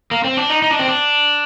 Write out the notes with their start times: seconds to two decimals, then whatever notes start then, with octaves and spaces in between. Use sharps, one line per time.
0.11 A#3
0.24 C4
0.37 D4
0.49 D#4
0.62 D#4
0.71 D4
0.79 C4
0.88 D4